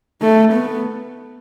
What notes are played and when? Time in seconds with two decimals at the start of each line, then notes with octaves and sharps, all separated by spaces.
0.21 A3
0.53 B3